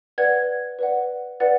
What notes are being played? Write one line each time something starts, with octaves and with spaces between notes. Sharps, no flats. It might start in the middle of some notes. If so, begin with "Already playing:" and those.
B4 D5 F#5 G#6
B4 D5 F#5
B4 D5 F#5 A6